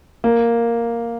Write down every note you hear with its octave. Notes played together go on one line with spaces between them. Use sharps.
A#3